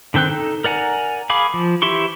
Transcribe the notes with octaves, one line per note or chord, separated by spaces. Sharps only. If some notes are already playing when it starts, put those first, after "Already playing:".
D3 D#3 C4 G5 F#6
D#4 A4
A#4 D5 F#5 G#5 A#5
G#4 F5 B5 D6
F3
E3 E4 G4 C6 C#6